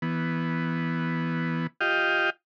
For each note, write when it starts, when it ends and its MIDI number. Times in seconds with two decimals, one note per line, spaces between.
0.02 1.67 52
0.02 1.67 59
1.81 2.30 65
1.81 2.30 67
1.81 2.30 75
1.81 2.30 77
1.81 2.30 79